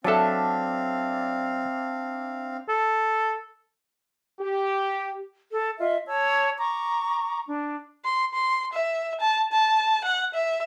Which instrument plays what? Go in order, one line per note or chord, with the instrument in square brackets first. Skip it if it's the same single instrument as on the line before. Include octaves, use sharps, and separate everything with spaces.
[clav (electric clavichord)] F#3 A4 [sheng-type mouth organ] C4 F5 [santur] D4 E5
[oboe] A4
[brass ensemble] G4
[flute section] A4
F4 D#5 E5
C#5 A5 E6
A#5 C#6 D6
D4
[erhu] C6
C6
E5
A5
A5
F#5
E5